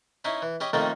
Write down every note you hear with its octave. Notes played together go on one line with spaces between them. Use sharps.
C#4 D#4 E4 B5
E3
C#4 G4 D#5 B5
F2 D#3 A3 A#3 C#4 D#4